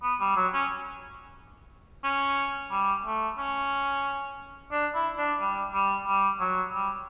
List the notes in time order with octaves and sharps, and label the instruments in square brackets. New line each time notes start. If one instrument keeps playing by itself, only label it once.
[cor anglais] B3
G3
F#3
C#4
C#4
G3
A3
C#4
D4
E4
D4
G3
G3
G3
F#3
G3